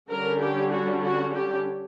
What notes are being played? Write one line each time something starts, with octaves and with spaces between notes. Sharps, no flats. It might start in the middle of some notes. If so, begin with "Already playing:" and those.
D3 G3 C#4 A#4
G4
F#4
F#4
G4